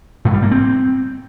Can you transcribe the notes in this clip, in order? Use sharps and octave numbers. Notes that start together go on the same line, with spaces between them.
G#2
G3
A#3
C4